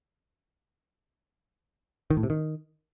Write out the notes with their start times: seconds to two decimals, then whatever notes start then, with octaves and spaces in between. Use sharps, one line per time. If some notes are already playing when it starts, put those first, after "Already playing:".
2.10 D#3
2.17 A2
2.23 C3
2.30 D#3